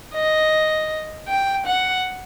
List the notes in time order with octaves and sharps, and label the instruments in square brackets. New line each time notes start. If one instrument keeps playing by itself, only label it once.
[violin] D#5
G5
F#5